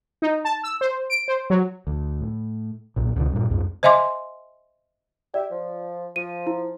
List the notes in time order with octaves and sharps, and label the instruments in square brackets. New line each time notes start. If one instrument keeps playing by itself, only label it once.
[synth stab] D#4
A5
E6
C5
D7
C5
F#3
[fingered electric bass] D2
A2
B1 A#2
C#2 B2 D3
G2 A#2
C2 F2 G#2
[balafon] C5 D#5 E5 G#5 C6 D6
[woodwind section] G4 E5 [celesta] D5
[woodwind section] F3
[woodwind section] F3 [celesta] D#7
[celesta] E4